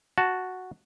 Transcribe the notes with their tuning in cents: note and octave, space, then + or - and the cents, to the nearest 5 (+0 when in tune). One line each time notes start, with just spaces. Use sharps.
F#4 +0 A5 +0